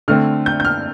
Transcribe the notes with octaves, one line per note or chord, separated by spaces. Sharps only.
D3 A3 C4 F6
G6
G6
F6